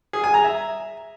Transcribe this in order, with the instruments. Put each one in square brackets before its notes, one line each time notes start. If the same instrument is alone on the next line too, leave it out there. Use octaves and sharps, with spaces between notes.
[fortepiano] G#4
G#5
A#5
E5